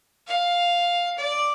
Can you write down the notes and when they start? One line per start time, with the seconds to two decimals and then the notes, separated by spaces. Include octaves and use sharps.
0.28 F5
1.18 D5